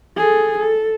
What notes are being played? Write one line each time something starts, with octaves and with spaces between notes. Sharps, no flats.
G#4 A4
A4